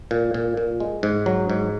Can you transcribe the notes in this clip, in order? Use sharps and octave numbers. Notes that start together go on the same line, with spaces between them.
A#2
A#2
A#2
G#3
G#2
F#3
G#2